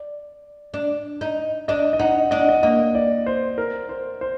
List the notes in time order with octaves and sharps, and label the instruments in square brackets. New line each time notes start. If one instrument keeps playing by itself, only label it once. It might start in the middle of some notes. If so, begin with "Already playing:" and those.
Already playing: [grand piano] D5
[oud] D4
D#4
[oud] D4 [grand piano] D#5
[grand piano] D#5
[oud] D#4 [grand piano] F#5
[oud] D4 [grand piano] D#5
[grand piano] F#5
D#5
[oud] A#3 [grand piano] D#5
[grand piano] D5
C5
A#4
C5
C5